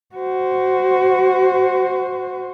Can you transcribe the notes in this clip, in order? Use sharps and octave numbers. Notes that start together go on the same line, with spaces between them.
F#4 C5